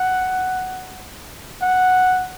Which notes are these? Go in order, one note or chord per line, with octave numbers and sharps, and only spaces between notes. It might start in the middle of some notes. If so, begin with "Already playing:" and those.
Already playing: F#5
F#5